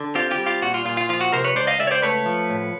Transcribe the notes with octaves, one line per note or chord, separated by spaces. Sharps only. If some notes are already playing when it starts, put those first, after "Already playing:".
Already playing: D3
C4 F4 G4
F4 G4
G3
F4 G4
A#2 F#4
F4
A#2 F4
F4
F3 F4
F#4
C3 A#4 C5
B4 C#5
C#2 C5 D5
D#5 F5
C#2 D5 E5
C#5
C5 D5
A3 B4 C#5
F3
A2